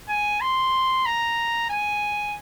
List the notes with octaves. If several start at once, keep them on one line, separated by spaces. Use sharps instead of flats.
G#5
C6
A#5
G#5